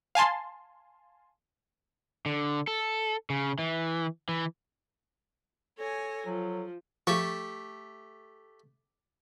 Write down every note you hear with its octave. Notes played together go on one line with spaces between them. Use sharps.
F5 G#5 A5 C6
D3
A4
C#3
E3
E3
A4 C#5 G#5 A#6
F3 F#3
F3 A3 G4 A5 C#6